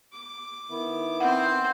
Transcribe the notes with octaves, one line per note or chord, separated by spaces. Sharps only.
D6
D#3 B3 E4
C4 C5 F#5